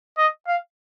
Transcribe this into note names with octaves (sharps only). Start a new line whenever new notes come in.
D#5
F5